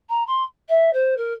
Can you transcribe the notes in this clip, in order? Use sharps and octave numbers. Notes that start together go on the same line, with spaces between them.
A#5
C6
E5
C5
A#4